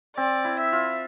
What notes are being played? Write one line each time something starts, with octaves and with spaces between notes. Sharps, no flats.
C4 D5
E4
E5
F4